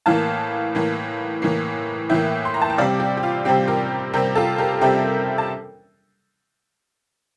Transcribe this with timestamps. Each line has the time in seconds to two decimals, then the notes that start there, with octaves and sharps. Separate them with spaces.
0.06 A2 E3 A#3 F5 A5
0.75 A2 E3 A#3
1.42 A2 E3 A#3
2.10 A2 E3 A#3 E5 G5
2.45 C6
2.54 A#5
2.62 A5
2.70 G5
2.78 C3 G3 C4 D5 F5
3.00 G4
3.17 G4
3.23 F4
3.45 C3 G3 C4 G4
3.68 G4 A#4
4.13 C3 G3 C4 G4 A#4
4.35 F4 A4
4.58 G4 A#4
4.81 C3 G3 C4 E5 G5
5.38 A5